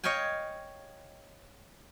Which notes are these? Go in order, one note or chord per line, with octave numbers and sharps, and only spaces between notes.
C#5 D#5 F5 G5 G#5